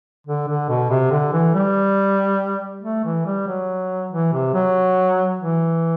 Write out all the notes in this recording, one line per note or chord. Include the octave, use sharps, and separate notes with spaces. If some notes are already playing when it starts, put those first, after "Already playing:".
D3
D3
B2
C3
D3
E3
G3
A3
E3
G3
F#3
E3
C3
F#3
E3